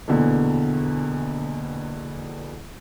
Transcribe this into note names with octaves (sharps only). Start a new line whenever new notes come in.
A#1 E2 B2 D3